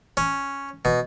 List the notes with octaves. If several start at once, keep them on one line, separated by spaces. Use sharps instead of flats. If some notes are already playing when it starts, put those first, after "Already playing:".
C#4
B2